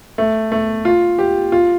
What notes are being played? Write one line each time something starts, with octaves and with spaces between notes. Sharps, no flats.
A3
A3
F4
G4
F4